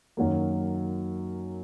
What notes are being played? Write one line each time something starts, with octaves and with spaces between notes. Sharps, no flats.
F#2 D#3 F#3 A#3